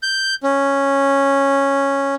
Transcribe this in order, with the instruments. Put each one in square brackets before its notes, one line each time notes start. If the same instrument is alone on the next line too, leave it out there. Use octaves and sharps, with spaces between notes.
[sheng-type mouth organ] G6
C#4